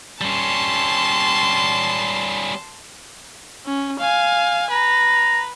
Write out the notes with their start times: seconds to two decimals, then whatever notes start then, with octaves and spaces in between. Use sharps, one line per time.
0.21 G3 C#4 A5 C6
3.66 C#4
4.00 F5 G#5
4.71 B4 A#5